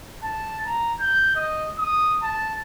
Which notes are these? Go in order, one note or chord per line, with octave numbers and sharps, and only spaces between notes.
A5
A#5
G6
D#5
D#6
A5